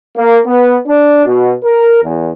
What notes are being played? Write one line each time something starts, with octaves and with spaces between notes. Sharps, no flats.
A#3
B3
D4
B2
A#4
E2